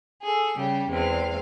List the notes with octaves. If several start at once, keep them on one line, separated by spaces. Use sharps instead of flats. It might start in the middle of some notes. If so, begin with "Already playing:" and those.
G#4 A4
C#3 G3 G4
E2 G#3 C4 F5